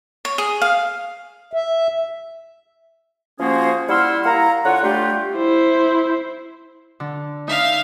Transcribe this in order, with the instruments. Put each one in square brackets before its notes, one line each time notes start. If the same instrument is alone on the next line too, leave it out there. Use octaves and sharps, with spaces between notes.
[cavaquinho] C#5
G#4
F5
[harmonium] E5
[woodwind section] F3 A#3 C#4 F#4 G#4 C5
G3 E4 F#5 C6 E6 F6
A#3 E4 F#5 A#5
D3 F4 C#5 F#5
G3 A3 D4 F4 G4
[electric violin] E4 C5
[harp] D3
[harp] D#4 [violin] E5 F5